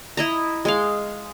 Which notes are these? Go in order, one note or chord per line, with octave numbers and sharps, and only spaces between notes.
E4 D#5 A#5
G#3 G#4 F5